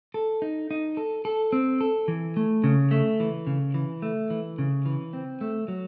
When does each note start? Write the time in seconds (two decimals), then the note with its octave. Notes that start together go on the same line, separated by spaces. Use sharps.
0.14 A4
0.42 D#4
0.71 D#4
0.97 A4
1.25 A4
1.53 C4
1.81 A4
2.08 E3
2.37 A3
2.64 C#3
2.91 A3
3.20 E3
3.47 C#3
3.74 E3
4.02 A3
4.30 E3
4.59 C#3
4.86 E3
5.13 C4
5.41 A3
5.68 F#3